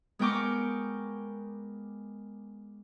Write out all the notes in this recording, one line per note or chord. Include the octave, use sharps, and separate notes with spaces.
G#3 B3 A#4 G5 C#6 D6